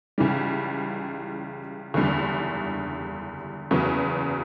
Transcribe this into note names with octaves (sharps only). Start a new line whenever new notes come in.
C#2 C#3 E3 G3
F#1 E2 D3 G3
F#1 E2 C#3 F#3 B3